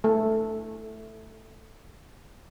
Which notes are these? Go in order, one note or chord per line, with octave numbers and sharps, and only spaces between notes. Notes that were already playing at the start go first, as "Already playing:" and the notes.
A3 A4